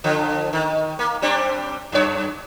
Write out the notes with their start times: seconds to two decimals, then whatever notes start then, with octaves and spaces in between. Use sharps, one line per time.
0.04 D3 F3
0.53 D#3
0.99 A#3
1.22 G3 C4 D4
1.92 F#2 C#5